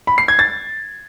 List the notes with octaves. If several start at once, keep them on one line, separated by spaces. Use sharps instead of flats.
B5
C7
G#6
A6